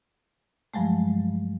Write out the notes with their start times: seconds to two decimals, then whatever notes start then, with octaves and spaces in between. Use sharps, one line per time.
0.74 G2 F3 F#3 G#3 A3